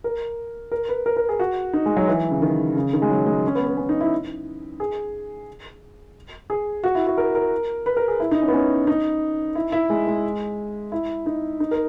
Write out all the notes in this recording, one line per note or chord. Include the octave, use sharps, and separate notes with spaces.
A#4
A#4
B4
A#4
A#4
G#4
F#4
D#4
G#3
F#3
E3
C#3
D#3
C#3
D#3
G#3
F#3
G#3
C#4
B3
B3
C#4
D#4
E4
G#4
G#4
F#4
E4
F#4
A#4
A#4
B4
A#4
G#4
E4
D#4
C#4
B3
C#4
D#4
E4
E4
G#3
G#3
E4
D#4
D#4
A#4